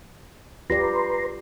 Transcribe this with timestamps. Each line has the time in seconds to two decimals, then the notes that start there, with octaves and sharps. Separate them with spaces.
0.70 F4 G4 B4 D5 A#5 C6